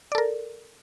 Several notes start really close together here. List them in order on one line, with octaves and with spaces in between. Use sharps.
D5 A4 A#4